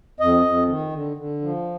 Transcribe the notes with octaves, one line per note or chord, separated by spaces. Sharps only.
F2 D#5
F2
D#3
D3
D3
F3